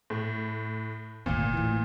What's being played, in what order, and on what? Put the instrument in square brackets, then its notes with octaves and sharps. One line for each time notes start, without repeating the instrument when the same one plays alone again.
[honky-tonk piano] A2
[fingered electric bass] D#1 G#1 D2 [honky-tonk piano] A#2
[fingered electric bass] A2 E3